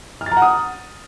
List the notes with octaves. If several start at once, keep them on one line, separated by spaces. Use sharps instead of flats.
F6
A6
A#5
F#5
D#6